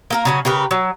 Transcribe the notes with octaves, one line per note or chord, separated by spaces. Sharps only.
A#3 A4 A#4
C#3 F#3 C#4
C#3 G4 A#4 B4
F#3